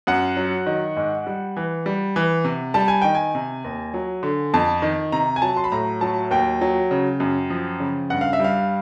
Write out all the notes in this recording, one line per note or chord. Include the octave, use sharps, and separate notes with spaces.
F#2 F#5
F#3
D#3
G#2
G3
E3
G3
E3
C3
G3 A5
G#5
D#3 G5
G#5
C3
D#2
F#3
D3
F2 A5
D#3
C3 A#5
G#5
F#3 A5
C6
B5
A2 A#5
F#3 A5
D#2 G5
F#3
C#3
F#2
F3
C#3
G2 F#5
F5
E5
G3 F5